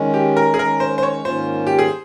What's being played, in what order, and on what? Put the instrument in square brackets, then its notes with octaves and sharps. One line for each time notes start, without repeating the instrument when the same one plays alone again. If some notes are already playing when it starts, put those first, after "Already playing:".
Already playing: [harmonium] D#3 G#3 C#4
[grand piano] G4
A#4
G#4
[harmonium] D#3 G#3 C#4 [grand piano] A#4
[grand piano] C5
C5
C#5
[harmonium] G#2 D#3 A#3 C#4 F4 [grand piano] C5
[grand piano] G4
G#4